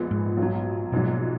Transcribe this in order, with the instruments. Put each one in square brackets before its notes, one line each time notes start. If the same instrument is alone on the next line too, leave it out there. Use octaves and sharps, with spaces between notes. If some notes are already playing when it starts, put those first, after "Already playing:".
Already playing: [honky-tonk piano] A#1 A#2 G#3 B3
[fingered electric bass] G#2
[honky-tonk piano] B1 A#2 F#3
[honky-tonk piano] A#1 G#2 F#3 [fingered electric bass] B2